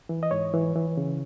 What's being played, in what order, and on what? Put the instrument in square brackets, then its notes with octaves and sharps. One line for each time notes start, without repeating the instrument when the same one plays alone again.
[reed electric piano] E3
D#5
G#2 C#5
E3
E3
C#3